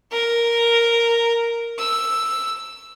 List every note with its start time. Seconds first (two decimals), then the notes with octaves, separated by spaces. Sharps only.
0.12 A#4
1.79 E6